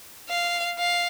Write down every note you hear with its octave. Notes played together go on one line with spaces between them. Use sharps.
F5
F5